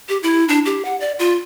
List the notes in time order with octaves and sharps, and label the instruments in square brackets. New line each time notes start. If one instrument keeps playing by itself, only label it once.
[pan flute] G4
E4
D4
G4
F#5
D5
F4